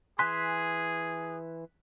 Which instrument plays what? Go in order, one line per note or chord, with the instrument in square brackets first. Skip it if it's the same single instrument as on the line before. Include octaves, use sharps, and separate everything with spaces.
[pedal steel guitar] E3 G#5 C6 [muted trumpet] G#4 [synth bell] F#6 B6